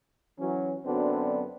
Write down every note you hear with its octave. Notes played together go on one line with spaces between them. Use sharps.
E3 F#3 C#4
F#2 D3 F#3 B3 C4 D4